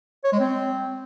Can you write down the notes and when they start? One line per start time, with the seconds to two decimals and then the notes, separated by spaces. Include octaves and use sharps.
0.24 C#5
0.32 G#3
0.40 C4